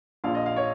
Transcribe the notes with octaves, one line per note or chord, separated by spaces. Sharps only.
A#1 A#2 F5
D#5
F5
C#5